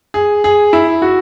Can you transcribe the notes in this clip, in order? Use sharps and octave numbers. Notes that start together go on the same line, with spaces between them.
G#4
G#4
E4
F#4